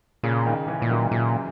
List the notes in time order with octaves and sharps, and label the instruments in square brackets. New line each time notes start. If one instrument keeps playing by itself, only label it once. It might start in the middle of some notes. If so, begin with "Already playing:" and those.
[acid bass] A#2 [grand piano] C#3
[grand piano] D#3
C#3 E3
[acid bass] A#2 [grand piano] E3
[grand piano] D#3 F#3
[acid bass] A#2 [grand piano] C#3 E3